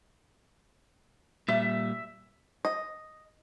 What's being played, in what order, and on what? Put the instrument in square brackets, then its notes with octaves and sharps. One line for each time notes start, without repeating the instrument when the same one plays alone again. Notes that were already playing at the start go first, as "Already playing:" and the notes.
[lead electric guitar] A#2 G3 [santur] E5
[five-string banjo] D#5